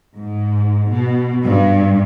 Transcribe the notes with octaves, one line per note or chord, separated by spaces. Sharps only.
G#2
B2
G2